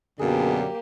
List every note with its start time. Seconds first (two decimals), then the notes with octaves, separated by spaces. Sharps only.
0.19 F#2 B2 D3 A#3 G4 G#4